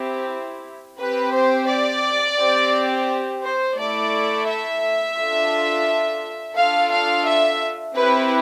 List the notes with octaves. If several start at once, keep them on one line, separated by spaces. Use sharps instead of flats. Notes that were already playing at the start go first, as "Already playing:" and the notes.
Already playing: C4 E4 G4
C4 G4 B4
C5
D5
C4 G4
C5
A3 E4 A4 D5
E5
D4 F4 A4
D4 F4 A4 F5
F5
E5
C4 E4 G4 B4